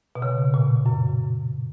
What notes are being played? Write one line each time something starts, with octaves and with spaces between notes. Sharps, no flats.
B2
C#3
A#2
F#2